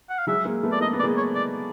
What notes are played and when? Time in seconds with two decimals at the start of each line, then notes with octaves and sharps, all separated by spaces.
0.09 F#5
0.19 F5
0.27 F#3 G#3 E5
0.45 G#3 A#3
0.63 A3 B3
0.72 D5
0.81 A#3 D#5
0.93 B3
0.99 D5
1.03 G#3 A#3
1.17 C#5
1.35 D5